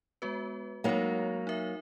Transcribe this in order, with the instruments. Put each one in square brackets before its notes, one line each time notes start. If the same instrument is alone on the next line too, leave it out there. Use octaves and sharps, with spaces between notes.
[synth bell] G#3 B3 F#4 B4
[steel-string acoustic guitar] F#3 A#3 [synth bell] G#3 D#4 F#4 A#4 C#5
[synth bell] D#4 A#4 E5